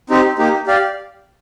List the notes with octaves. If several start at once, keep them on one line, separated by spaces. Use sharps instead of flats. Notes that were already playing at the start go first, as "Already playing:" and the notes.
C4 D#4 G4
A#3 D#4 G4
G4 D5 F5